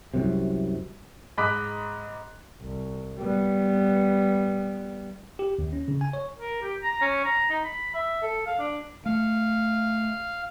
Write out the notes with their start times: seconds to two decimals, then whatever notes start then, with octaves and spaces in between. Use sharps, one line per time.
0.14 C2 F#2 C3
1.38 G#2 D#5 B5 D6 F#6 B6
2.61 C2
3.19 G3 B3
5.39 G4
5.59 D#2
5.73 C#4
5.88 C#3
6.01 G#5
6.13 C#5
6.38 A#4
6.62 G4
6.82 A#5
7.01 C#4
7.25 A#5
7.50 D#4
7.64 B5
7.94 E5
8.23 A4
8.47 F5
8.59 D4
9.06 A3 F5